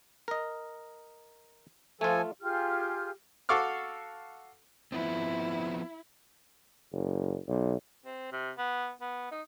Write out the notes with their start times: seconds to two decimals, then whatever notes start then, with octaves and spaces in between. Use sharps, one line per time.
0.28 A#4 D#5
2.01 F3 A3 F4 A4 G#5
2.41 F4 G4 G#4 F6
3.49 F#4 A4 F5 C#6 D6 F6
4.92 F3 B3 C4 E4
6.92 F#1
7.48 B1
8.06 C4
8.32 C3
8.58 B3
9.01 B3
9.31 D#4